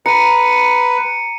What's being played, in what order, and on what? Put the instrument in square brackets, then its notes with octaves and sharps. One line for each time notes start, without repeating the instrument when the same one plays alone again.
[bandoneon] B4 [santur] A#5 [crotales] C#7 D#7